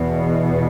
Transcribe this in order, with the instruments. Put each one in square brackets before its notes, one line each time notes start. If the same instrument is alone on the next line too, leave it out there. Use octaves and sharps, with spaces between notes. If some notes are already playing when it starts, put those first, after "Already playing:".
Already playing: [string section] E2 B2